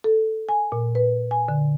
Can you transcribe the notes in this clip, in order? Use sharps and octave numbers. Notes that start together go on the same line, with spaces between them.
A4
G#5
A#2
B4
G#5
D3